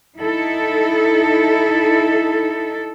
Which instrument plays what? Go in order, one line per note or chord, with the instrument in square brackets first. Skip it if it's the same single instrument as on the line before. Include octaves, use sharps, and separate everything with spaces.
[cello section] D#4 E4 A4